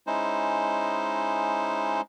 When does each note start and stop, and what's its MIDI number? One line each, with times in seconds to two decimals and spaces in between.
0.07 2.01 56
0.07 2.01 61
0.07 2.01 63
0.07 2.01 64
0.07 2.01 72